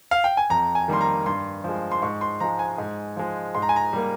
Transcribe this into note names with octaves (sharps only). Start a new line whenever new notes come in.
F5
G5
G#5
F2 A#5
G#5
D#3 G3 A#3 C6
A#5
G2 C6
F3 G#3
C6
G#2 C#6
C6
F3 G#3 A#5
G#5
G#2
F3 G#3
G#2 C6
A#5
G#5
A#5
G3 A#3